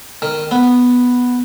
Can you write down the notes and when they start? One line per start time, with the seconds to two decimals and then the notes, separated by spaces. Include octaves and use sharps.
0.22 D#3
0.51 B3